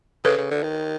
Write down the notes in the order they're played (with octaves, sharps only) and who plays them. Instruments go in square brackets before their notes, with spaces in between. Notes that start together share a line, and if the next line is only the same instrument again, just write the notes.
[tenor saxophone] C#3 [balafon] A4 B4
[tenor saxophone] C#3
D3
D#3